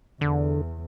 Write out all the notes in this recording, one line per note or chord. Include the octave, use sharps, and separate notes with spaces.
E2 D3